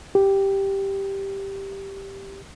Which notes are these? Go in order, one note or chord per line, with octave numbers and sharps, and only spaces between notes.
G4